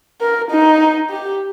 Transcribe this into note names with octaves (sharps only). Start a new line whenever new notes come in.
A#4
D#4
G4